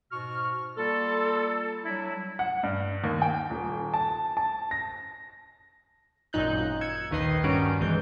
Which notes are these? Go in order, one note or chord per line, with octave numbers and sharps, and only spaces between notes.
G#2 B2 F#4 C#6 F6
G3 A#3 F4 A4
F#3 G3 D4 E4
F#5
G2
D#2
G5
D#1
A5
A5
A#6
G#1 F#2 A#2 D#4 F#6 G6
E6 G#6 C#7
A#1 D#2 D#3 B4 D#5 C7
G2 D#3 G3 C#4 F#4 D7
B1 E3 G#3 G6